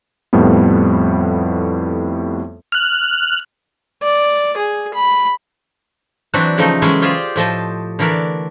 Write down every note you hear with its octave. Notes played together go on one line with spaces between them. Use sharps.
F2 A2 G3 B3
F6 F#6
D5
G#4
B5
E3 F#3 C4 D4 F#4
C#3 F3 A3 D#4 D#5
E3 F#3 G#3 C#4 G#4
F4 G4 G#4 C5 D5
A2 F3 D#5 A5
D3 E3 A3 A#4 D5